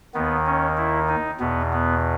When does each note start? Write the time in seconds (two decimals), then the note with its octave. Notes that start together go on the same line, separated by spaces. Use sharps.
0.14 D#2 D#3 B3
0.46 C#4
0.77 E4
1.09 D#4
1.40 E2 B2 B3
1.73 B3